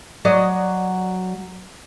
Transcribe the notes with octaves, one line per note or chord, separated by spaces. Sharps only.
F#3 D5 D#5